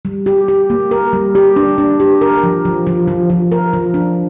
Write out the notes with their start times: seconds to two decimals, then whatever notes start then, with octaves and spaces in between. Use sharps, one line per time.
0.05 G3
0.26 G4
0.48 G4
0.70 A#3
0.91 A#4
1.13 G3
1.35 G4
1.56 D4
1.78 D4
2.00 G4
2.21 A#4
2.43 F3
2.65 F3
2.87 F3
3.08 F3
3.30 F3
3.52 A#4
3.73 F3
3.94 D4